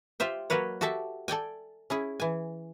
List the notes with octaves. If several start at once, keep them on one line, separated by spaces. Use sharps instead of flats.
F4 G4 C5 E5 G5
F#3 A#3 A#4 B4 C#5
F#4 G4 A4 E5 A5
A4 D5 G5 G#5
C#4 E4 G#4
E3 G#5